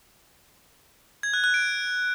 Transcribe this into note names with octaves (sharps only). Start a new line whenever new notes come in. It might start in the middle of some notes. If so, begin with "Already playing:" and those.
G#6
F#6
F#6
D7